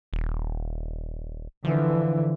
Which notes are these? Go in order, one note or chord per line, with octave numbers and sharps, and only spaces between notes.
D#1
D3 E3 F3